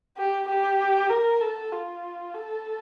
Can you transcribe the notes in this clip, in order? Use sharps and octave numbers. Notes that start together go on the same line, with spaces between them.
G4
G4
A#4
A4
F4
A4